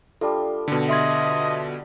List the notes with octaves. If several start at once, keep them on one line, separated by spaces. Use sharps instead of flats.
G3 D4 F4 A4
B2 D3
D#5 E5 C6 G#6